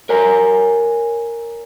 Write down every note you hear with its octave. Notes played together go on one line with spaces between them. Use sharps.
A#4 C#5 G#5 A#5